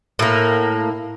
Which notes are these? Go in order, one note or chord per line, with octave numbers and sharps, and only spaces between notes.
A2 A#3